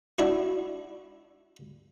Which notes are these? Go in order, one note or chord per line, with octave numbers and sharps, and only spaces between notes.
D4 E4 F#4